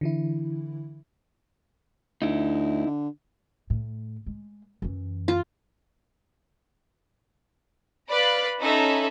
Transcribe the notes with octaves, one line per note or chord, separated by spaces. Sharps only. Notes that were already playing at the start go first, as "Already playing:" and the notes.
D3 E3 E4
D2 D#4 E4
D3
A2
G#3
F#2 E3
F4
B4 D5 F5 B5 F#6
C#4 D#4 A4 E5 B5